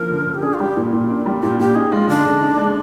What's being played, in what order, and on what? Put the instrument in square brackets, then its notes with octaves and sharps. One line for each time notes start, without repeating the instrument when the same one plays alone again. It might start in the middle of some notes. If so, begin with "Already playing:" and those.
Already playing: [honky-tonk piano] D3 F3 A#3 [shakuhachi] A#4
[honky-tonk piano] D3
D3
[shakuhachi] G4
[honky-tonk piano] D4 [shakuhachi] G#4
[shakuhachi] F4
[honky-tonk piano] G3 [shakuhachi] G4
[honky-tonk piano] A#2
A#2
D4
G3
[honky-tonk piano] A#2 [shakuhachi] G4
[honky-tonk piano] A#2 [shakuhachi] G4
[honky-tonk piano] D#4 [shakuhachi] G#4
[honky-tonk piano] G#3 [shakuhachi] F4
[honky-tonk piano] D3 [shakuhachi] D4
[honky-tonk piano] D3
D#4
G#3